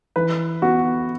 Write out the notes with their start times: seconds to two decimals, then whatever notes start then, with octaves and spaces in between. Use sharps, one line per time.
0.16 E3 B4
0.62 B3 F#4